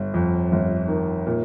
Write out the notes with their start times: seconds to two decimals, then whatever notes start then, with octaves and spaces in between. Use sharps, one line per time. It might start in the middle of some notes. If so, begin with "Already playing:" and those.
Already playing: G1
0.14 F2
0.52 G1
0.88 D#3
1.27 A#2